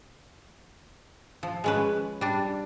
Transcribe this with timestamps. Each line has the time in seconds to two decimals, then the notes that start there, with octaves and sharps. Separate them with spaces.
1.43 F3
1.64 G#3 C#4 B4
2.21 G3 D4